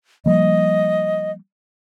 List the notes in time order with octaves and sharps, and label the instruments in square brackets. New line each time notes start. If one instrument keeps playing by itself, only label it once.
[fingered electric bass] F3 G3 A#3 [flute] D#5